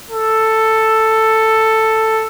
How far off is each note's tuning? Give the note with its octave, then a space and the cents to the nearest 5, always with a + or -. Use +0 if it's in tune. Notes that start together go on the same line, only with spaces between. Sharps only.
A4 +5